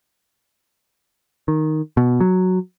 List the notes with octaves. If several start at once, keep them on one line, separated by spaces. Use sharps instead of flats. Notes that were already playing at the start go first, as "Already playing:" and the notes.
D#3
B2
F#3